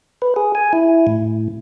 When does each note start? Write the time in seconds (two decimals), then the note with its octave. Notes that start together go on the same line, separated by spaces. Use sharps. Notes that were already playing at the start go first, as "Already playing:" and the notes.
0.22 B4
0.36 G#4
0.55 G#5
0.73 E4
1.07 A2